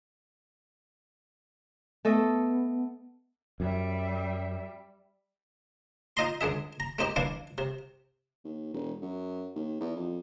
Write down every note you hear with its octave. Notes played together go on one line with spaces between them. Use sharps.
A3 B3 A4 D#5
F#2 G3 E5
D#4 F4 D#5 A#5 C6
C#2 D3 G#4 E5
A#5
A3 C4 D#4 G4
E3 D4 E4 F5
C3
D#2
E1
F#2
D#2
E2
F2